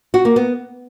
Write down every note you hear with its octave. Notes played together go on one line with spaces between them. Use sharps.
F#4
A#3
B3